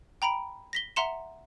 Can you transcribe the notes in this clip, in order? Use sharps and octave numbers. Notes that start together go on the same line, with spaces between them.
G5 A#5 B5 D7
A#6 B6 G7
E5 F#5 A#5 C6 C#7 E7